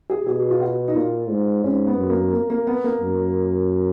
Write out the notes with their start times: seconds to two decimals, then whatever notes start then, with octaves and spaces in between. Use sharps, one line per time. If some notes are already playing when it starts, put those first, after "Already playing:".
0.10 G#4
0.27 B2 G#4
0.51 F4
0.61 F#4
0.88 D#4
0.95 A#2 F4
1.29 G#2
1.64 G#2 C#4
1.87 B3
1.98 F#2
2.09 A#3
2.33 A#3
2.50 A#3
2.67 B3
2.84 A#3
3.01 F#2